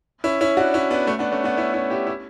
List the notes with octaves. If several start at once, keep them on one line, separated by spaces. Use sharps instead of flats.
C#4 E4
C#4 E4
D4 F#4
C#4 E4
B3 D4
A3 C#4
B3 D4
A3 C#4
B3 D4
C#4 E4
C#4 E4
E4 G4
C#4 E4